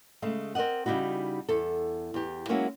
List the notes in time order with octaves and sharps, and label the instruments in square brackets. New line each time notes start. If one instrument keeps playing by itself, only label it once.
[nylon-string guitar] C#3 G#3 A3
C4 A#4 D5 D#5 F#5
C#3 G3 D#4 E4 F#4
E2 A4
E2 G4
F#3 G#3 A#3 C#4 E4 F#4